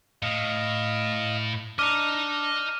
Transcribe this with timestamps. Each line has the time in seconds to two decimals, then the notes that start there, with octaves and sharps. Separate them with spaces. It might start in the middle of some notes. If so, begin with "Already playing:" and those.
0.22 A2 D#5 F5
1.79 D4 D#5 A#5 D6 F6 D#7